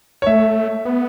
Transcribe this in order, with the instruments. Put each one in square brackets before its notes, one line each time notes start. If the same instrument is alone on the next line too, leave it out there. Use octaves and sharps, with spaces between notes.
[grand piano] C#5
[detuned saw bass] A3 [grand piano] E5
[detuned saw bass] B3